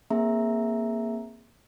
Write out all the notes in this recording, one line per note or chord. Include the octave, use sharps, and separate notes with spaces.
A#3 C4 G#4 E5 A#5